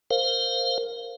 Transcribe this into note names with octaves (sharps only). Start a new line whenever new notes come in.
A#4 C5 F5